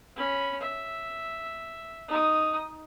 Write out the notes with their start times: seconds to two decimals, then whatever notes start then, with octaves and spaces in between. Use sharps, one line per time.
0.16 C#4 B5
0.60 E5
2.08 D#4 D#6